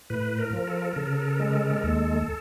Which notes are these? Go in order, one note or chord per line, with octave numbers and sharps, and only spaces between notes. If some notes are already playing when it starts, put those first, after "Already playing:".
A2 B4
A#4
F3
A4
A#4
A4
A#4
C#3 A4
A#4
A4
A#4
A4
A#4
G#3 A4
A#4
A4
A#4
A4
A#4
D#2 A4